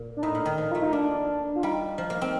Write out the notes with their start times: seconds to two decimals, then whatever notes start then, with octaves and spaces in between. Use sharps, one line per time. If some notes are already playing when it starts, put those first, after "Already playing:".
Already playing: A#2
0.17 D4
0.23 A2 D#4
0.35 A#2
0.46 D#3
0.58 F3
0.72 A3 F4
0.82 D#4
0.93 A#3 D4
1.55 F4
1.63 G3 D#4
1.98 F3
2.10 A#3
2.21 C4